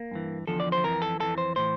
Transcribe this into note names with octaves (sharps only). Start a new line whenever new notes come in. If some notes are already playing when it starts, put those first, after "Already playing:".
Already playing: A#3
G2 E3
E2 D3 F3 A4
D5
C5
F2 E3 A#4
A4
F2 E3 A4
C5
A2 E3 C5